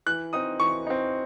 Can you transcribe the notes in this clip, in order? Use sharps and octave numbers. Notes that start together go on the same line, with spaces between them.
E3 F#6
C4 D#4 D#6
E3 C#6
C4 D#4